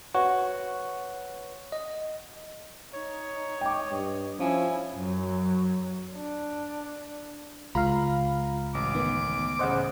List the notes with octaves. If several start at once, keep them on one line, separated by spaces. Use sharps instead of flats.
F#4 B4 C#5
D#5
D#4 C#5
D#5 G5 D6
G2
F3 C#4 E4 G#5
F#2 F#3
D4
C#2 F4 F5 A#5 B5
A1 D6
D#3 B3
A1 C#3 C5 D#5 F#5